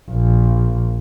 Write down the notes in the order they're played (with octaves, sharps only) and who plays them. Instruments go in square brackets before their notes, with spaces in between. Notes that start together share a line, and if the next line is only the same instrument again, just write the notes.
[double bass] A#1